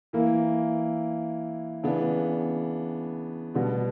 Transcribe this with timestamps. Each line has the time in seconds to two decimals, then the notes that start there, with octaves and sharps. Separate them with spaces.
0.13 E3 A#3 E4
1.83 C#3 E3 B3 D4
3.54 B2 G3 B3 D4